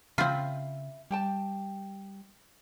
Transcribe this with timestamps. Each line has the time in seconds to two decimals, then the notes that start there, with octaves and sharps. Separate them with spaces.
0.18 C#3 C4 F4 E5 B5
1.11 G3 G4 G5 A5